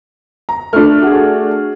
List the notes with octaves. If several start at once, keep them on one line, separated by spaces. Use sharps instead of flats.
A#5
A3 D4 F6
F#4 G#4